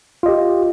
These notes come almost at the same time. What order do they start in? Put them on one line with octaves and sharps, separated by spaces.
F4 D#5 G4